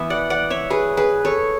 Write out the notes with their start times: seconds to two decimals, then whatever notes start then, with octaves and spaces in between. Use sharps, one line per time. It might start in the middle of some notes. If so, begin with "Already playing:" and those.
Already playing: E3 B3 E4 E5
0.10 D5 F#5
0.30 D5 F#5
0.50 C#5 E5
0.70 G#4 B4
0.97 G#4 B4
1.25 A4 C#5